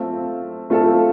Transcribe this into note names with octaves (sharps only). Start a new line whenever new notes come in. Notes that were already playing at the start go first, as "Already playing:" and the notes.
Already playing: A3 C4 F4 A4
A3 C4 F4 A4